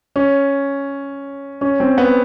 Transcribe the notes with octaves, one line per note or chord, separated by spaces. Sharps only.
C#4
C#4
C4
B3